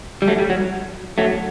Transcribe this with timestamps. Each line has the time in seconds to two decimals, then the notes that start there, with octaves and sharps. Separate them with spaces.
0.22 G3
0.27 F#3 A3
0.38 G3
0.50 F#3
1.18 F#3 A3